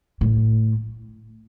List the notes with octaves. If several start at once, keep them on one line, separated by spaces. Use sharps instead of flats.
A2